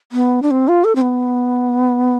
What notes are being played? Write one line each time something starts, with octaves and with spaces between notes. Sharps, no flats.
B3
D4
C4
F4
A4
C4
B3